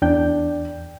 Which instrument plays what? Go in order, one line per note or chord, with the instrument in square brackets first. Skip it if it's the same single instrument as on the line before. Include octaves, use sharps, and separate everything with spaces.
[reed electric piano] E2 G5 G6 [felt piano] D4